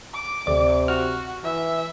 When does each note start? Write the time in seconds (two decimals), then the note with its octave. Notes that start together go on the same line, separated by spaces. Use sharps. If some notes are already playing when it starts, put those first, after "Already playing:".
0.14 D6
0.47 D2 C3 D5
0.88 F#4 F6
1.44 E3 E5